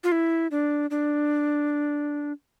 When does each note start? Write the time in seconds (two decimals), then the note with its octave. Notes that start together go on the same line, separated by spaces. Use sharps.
0.04 F4
0.12 E4
0.51 D4
0.90 D4